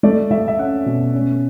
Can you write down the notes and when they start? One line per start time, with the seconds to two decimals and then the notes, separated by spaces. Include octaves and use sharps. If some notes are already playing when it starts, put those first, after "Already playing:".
0.03 A3 D5
0.31 A3 E5
0.48 E5
0.59 C#4 F#5
0.86 B2
1.14 C#4